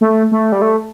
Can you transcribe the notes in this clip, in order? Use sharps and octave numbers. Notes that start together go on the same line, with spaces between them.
A3
A3
G3
A3